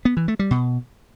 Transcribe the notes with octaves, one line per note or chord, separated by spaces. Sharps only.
B3
E3
A3
G3
B2